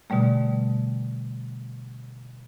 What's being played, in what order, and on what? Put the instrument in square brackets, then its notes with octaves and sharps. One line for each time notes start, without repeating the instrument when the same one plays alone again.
[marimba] B2 D3 G3 A3